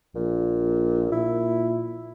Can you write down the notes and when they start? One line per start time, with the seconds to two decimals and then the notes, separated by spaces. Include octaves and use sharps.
0.16 A#1 A#2
1.12 A#2 E4